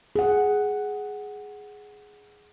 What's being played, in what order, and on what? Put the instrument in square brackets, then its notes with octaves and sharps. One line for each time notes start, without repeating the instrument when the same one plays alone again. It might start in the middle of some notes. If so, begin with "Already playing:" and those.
[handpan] G#4 F#5